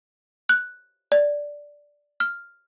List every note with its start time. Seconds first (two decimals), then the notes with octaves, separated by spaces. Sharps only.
0.49 F#6
1.12 D5
2.20 F6